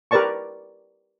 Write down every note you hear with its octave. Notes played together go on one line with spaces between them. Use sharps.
G4 A#4 B4 D5 A5 C#6